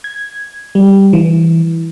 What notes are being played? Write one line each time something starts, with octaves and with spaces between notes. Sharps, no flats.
G#6
G3
E3